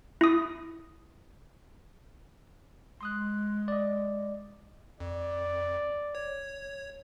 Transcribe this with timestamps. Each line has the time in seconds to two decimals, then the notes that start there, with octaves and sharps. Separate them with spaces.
0.21 E4 D#6
3.01 G#3 C6 D#6 F#6
3.68 D5 D#5
5.00 F2 D5
6.15 C#5